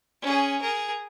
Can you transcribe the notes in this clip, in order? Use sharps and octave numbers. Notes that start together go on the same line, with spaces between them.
C#4 G#4
G#4 A#4